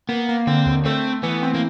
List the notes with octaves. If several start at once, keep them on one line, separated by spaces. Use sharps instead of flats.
A#3 B3
A#3
D3 C4
D#2
A3 C4
A3
E3 B3
C4
A#3